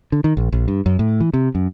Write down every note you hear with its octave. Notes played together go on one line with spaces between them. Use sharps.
D3
D#3
A#1
A#1
G2
F#2
A2
E3
C3
F#2